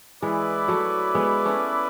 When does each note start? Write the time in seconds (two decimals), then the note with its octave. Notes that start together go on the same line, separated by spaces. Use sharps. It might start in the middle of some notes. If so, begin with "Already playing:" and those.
0.22 E3 G#3 E4 B4 D5
0.68 F#3 A3
1.15 G#3 B3
1.45 A3 C#4